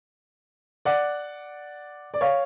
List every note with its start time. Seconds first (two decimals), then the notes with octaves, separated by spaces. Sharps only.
0.85 D5 F#5
2.14 D5
2.21 C#5 F5